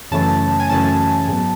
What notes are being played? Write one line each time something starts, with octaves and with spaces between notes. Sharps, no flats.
F#2 C#3 E3 A3 C#4 A5
G#5
F#2 C#3 E3 A3 C#4 A5
G#2 F#3 B3